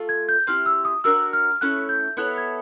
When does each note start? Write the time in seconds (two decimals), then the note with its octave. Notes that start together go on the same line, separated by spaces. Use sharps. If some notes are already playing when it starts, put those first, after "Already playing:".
Already playing: A3 F4
0.09 G#6
0.29 G6
0.47 C4 E4 G4 F6
0.66 E6
0.85 D#6
1.04 D4 F#4 A#4 E6
1.33 F6
1.61 A3 C#4 E4 F#6
1.89 G6
2.17 B3 E4 A4 C#5 F#6
2.38 G#6